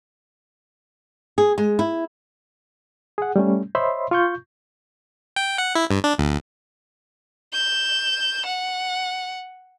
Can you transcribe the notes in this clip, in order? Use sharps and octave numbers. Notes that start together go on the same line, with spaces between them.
G#4
G#3
E4
G#4 F#5
G3 A3 C#4
C5 C#5 D#5 E5 B5 C6
F4 C#6 G6
G5
F#5
E4
G2
D4
D2
G6 E7
F#5